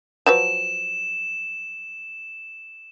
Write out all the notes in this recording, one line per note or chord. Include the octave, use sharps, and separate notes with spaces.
F3 F#3 B4 E7